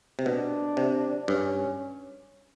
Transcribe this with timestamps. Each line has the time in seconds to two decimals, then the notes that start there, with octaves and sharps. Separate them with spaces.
0.19 C3
0.26 B2 D4
0.77 C3
1.28 G2 C#4